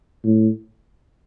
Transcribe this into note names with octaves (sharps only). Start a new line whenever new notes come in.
A2